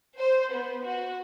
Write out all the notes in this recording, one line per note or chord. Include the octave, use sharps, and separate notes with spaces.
C5
B3
F#4